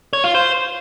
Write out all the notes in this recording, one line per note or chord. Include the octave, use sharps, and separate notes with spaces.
C#5
F4
C5